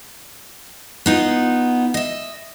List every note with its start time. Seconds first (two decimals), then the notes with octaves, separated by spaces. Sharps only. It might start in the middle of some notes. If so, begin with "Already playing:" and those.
1.06 B3 D#4 F4
1.94 D#5 E5